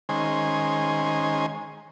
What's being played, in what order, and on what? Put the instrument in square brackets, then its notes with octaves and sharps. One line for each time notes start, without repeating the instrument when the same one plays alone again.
[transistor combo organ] D#3 G#3 C#4 C5 G#5